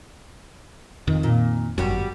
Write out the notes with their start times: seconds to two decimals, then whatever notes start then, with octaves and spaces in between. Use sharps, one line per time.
1.07 F2 D#3
1.23 A#2
1.78 G1 F#2 G3 F#4